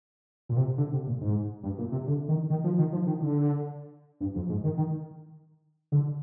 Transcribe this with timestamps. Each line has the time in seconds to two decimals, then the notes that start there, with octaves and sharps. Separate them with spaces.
0.49 A#2
0.57 C3
0.78 D3
0.92 C3
1.07 A#2
1.21 G#2
1.63 G2
1.78 A#2
1.92 C3
2.07 D3
2.28 D#3
2.50 D#3
2.64 F3
2.78 D#3
2.93 F3
3.07 D#3
3.21 D3
4.21 G2
4.35 F2
4.49 G#2
4.64 D#3
4.77 D#3
5.92 D3